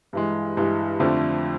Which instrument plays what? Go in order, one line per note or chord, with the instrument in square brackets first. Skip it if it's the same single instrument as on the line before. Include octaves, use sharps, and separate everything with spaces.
[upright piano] G2 E3 G#3
G2 E3 G#3
F2 D3 F3 A3 D4